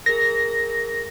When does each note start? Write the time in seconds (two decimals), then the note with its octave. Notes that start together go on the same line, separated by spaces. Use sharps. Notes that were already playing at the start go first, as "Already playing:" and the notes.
0.06 G#4 A#4 A#6